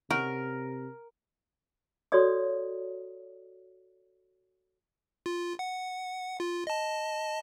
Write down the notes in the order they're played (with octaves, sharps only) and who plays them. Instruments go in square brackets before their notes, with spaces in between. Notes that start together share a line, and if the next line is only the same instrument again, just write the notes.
[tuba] C3 [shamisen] C#4 D#4 F#4 [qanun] A#4
[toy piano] F#4 A4 B4 C#5 D5 D#6
[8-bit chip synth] F4
F#5
F4
D#5 A5